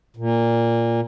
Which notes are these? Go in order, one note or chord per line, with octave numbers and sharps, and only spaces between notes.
A#2